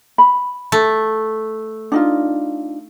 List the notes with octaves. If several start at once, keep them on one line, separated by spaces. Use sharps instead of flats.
B5
A3
D4 D#4 F4